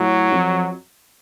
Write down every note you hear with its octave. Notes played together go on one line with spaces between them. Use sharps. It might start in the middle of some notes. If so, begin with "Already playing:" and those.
Already playing: A2 F#3
F2